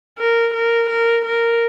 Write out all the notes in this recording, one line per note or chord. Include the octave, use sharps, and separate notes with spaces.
A#4
A#4
A#4
A#4